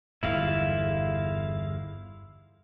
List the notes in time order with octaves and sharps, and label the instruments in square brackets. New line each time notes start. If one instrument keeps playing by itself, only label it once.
[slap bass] G1 E2 G#2 [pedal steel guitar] E4 F5